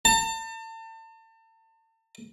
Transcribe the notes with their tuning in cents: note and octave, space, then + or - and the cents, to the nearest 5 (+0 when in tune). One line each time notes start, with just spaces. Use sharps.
A5 +35